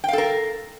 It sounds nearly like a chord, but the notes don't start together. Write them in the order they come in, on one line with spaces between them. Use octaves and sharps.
G5 F5 A4 A#4